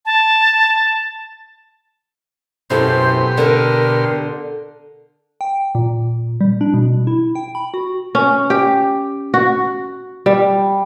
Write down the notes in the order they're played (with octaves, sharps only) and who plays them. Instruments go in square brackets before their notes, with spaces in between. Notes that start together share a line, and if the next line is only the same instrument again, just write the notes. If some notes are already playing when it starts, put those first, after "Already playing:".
[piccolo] A5
[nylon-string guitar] F#2 E4 A4 [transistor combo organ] B2 G4 C6 [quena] C5
[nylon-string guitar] D3 [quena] A#4
[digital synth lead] G5
A#2
G3
D4
B2
E4
G5
B5
F#4
[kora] C#4
G4
F#4
G3